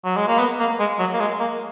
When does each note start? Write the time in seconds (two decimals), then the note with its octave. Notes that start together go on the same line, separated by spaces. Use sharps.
0.04 F#3
0.16 G#3
0.27 A#3
0.39 B3
0.59 A#3
0.79 G#3
0.99 F#3
1.13 A#3
1.20 G#3
1.40 A#3